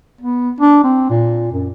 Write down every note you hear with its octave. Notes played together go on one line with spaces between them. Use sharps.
B3
D4
C4
A#2
F#2